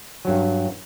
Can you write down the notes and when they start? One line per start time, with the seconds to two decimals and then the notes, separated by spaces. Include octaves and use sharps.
0.25 G2 F#3